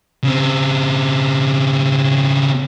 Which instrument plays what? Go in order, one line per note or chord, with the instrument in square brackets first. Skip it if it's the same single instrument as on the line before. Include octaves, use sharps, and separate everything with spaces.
[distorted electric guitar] C#3 C4